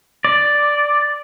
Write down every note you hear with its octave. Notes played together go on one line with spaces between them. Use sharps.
D5